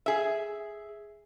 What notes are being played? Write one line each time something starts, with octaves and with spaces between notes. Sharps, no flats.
G#4 E5